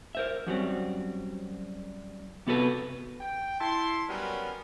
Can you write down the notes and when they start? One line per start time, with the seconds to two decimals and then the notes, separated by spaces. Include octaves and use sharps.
0.15 A#4 C5 E5
0.47 F#2 F#3 G3 C4
2.47 C3 B3 F#4 A4 B4
3.21 G5
3.61 E4 A5 C6
4.09 F#3 G3 B3 C#4 A#4